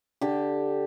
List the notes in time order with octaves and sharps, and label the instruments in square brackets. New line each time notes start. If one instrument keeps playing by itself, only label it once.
[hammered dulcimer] D3 G4